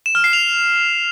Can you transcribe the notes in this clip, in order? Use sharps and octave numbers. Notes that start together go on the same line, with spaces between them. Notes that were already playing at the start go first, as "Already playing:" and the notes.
E7
F6
C7
F7